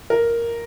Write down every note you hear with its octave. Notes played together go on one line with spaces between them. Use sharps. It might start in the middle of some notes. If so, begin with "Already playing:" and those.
A#4